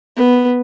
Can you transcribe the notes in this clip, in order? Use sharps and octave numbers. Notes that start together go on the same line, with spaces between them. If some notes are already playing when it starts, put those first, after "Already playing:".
B3